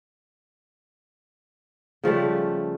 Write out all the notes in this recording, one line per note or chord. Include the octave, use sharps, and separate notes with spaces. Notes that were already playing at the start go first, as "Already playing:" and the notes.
C#3 F3 G3 A3